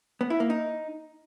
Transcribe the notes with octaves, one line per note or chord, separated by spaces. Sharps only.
B3
E4
A#3
D#4